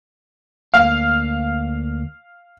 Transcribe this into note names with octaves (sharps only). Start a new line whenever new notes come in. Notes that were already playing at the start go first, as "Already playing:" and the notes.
D2 A#3 D4 F5